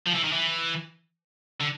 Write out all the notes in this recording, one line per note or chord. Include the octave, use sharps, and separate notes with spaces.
F3
E3
D#3
E3
D3